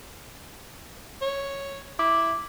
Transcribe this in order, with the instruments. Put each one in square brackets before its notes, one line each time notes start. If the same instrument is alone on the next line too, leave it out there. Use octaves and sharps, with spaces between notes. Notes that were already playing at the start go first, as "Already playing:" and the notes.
[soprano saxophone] C#5
[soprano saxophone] E4 [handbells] D6